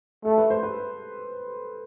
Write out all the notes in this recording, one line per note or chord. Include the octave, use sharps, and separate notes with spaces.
A3 A4
B4
C5
B4